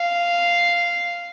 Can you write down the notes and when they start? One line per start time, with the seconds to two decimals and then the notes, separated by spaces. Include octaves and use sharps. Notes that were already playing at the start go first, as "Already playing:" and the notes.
Already playing: F5